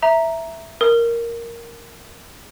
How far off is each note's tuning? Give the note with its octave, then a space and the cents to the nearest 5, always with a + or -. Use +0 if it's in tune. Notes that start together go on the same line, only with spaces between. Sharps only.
E5 +0 A#5 +0
A#4 +0 D#6 +0